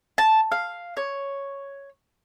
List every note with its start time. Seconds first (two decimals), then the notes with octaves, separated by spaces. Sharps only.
0.18 A5
0.52 F5
0.97 C#5